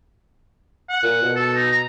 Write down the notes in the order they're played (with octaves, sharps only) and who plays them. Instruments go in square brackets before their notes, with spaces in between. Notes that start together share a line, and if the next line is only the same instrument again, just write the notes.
[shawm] F#5
[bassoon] A#2
B2
[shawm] A4
D#4
A#5